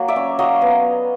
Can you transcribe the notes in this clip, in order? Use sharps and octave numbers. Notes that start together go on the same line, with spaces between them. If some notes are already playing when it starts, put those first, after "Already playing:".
Already playing: F#3 A#3
D5 E5
C#4
F#3 D#5 F5
B3